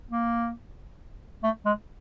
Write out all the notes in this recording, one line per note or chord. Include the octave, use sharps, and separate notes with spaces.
A#3
A3
G#3